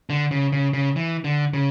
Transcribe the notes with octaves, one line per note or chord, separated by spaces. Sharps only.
D3
C#3
C#3
C#3
E3
D3
C#3